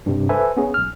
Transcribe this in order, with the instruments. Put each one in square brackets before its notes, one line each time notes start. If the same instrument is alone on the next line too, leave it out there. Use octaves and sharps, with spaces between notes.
[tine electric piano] G2 C3
A4 B4 C5 E5 G#5
B3 C#4 G#4
B1 F6